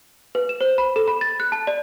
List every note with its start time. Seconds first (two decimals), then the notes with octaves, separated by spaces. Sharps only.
0.35 B4
0.49 E7
0.61 C5
0.78 B5
0.96 A4
1.08 B5
1.21 A6
1.40 F#6
1.52 A5
1.67 D5